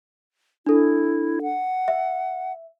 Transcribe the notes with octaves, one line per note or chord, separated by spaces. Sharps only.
D4 E4 A4
F#5
E5